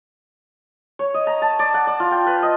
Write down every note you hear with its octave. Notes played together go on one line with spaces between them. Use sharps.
C#5
D#5
A#5
A5
D5
F#5
D5
F4
G5
B4
D#5